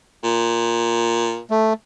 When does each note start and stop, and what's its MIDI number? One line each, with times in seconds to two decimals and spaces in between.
0.24 1.40 46
1.51 1.73 57